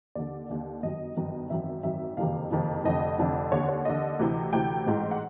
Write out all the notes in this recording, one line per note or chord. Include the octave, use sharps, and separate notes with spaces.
D#2 D3 D5
D#2 D3
G1 F#2 D#3 D#5
G1 F#2 D#3
G#1 F#2 D#3 E5
G#1 F#2 D#3 E5
F#1 F2 C3 D#3 F5
F#1 F2 C3 D#3
F1 F2 D3 D#5
F1 F2 D3
D#2 D3 C#5
C#5
D#2 D3 D#5
D2 C3 E3
D2 C3 E3 G5
A1 G#2 E3
F#5